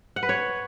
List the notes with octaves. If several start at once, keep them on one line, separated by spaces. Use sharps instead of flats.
F#5
B4
C#5